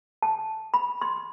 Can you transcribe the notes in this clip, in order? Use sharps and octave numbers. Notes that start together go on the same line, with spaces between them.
A5
B5
C6